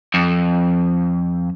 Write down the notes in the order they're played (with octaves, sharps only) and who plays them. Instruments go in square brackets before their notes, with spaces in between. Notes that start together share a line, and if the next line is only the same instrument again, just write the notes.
[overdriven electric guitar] F2